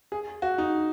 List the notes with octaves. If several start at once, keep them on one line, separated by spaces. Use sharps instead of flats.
G#4
F#4
D#4